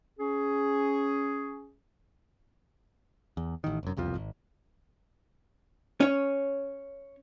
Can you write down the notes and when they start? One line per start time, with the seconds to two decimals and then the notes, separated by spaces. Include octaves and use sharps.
0.19 C#4 G#4
3.37 E2
3.64 A1 D#3
3.83 F1 F#2
3.97 E1 C2 F2 F3
4.15 G#1
6.00 C#4 C#5